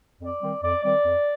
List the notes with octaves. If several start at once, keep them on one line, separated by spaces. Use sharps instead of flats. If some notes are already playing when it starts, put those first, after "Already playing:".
F2 D5
D#3 G3 C4
F2 D5
D#3 G3 C4 D5
F2